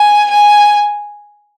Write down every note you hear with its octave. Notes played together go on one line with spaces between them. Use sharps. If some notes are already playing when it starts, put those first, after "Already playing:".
Already playing: G#5
G#5